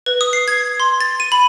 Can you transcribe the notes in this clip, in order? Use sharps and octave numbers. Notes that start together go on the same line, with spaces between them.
B4
D#6
C7
G#6
C6
A6
D#7
B5